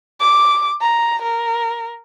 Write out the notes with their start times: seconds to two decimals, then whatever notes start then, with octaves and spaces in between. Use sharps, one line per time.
0.20 D6
0.81 A#5
1.22 A#4